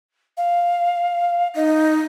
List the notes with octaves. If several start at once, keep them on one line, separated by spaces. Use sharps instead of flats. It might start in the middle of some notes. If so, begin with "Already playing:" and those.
F5
D#4 D#5